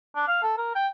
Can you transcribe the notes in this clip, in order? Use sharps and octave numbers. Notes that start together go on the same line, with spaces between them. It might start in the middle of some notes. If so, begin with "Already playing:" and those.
D4
F5
A4
A#4
G5